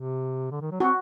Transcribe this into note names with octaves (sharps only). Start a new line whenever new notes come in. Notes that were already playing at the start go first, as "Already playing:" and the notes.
Already playing: C3
D3
D#3
F#3
C4 F#4